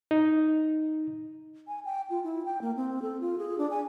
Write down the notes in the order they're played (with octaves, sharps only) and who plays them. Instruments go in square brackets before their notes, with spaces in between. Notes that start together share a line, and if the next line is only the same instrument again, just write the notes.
[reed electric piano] D#4
[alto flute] G#5
G5
F4
E4
G5
A#3
C4
A4
F4
G#4
D4
G#5